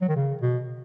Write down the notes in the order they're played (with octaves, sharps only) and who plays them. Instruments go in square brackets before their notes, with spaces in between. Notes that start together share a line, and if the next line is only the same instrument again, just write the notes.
[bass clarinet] F#3
D#3
C#3
B2